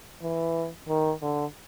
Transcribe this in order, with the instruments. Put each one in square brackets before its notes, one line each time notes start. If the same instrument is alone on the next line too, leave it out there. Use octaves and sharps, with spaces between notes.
[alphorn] E3
D#3
D3